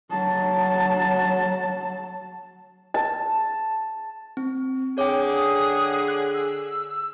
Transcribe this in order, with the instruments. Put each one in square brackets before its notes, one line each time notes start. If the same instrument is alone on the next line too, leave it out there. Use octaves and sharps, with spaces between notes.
[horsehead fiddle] F#3 A5
[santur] A5
[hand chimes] C4
[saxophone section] D3 G#4 [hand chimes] C#5 G5 [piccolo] D6
[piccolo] D#6
[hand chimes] F#6
[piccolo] E6